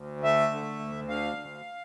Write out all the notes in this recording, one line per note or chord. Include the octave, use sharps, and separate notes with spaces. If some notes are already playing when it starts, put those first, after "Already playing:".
Already playing: D2
A3 E5
D3
D2
D3 F5
D2